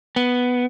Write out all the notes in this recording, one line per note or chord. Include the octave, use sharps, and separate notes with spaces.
B3